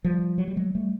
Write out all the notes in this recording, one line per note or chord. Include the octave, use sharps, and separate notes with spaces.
F3 G3
F#3
G3
F#3 G#3
G3 A3